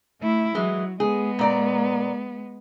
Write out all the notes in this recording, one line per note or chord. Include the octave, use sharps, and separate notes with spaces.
A3 E4
E3 F#3 G#3
G#3 B3 G#4
A#2 D5 A#5